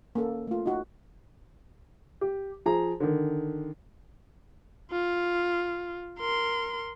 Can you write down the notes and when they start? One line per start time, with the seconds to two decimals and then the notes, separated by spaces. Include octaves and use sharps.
0.15 A#3 C#4 A4
0.47 A3 F4
0.66 D#4 F#4
2.21 G4
2.66 F3 G#4 A#5
3.00 D3 D#3
4.91 F4
6.20 A#4 C6